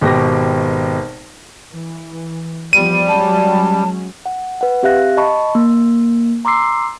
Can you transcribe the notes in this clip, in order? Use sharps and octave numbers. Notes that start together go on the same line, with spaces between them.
G#1 B2 G4 A#6
E3
E2 F3 G3 B3 D#7
F#3 G#3 C#4 A5
F#5
B4 F#5
C4 G4 E5 F5 F#6 A#6
D#5 A5 B5 C#6
A#3
A#5 C6 D6 E6 C7